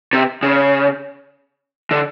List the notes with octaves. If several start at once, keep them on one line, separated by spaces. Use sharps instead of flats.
C3
C#3
D3